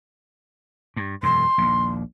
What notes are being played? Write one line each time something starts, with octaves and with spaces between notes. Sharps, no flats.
G2
E1 F#2 C6
A#1 D#2